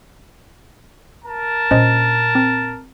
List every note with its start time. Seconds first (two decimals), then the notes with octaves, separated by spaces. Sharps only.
1.24 A#4 A5
1.71 A#2 C#4 D4 C5 D#5
2.35 C4